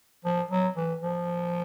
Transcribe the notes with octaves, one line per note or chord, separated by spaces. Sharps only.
F3
F#3
E3
F3